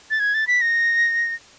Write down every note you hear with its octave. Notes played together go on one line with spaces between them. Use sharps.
A6
G#6
A6
B6
A#6